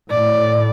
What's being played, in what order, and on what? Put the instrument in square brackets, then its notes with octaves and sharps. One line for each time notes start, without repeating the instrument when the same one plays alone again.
[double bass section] A2 [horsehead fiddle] D5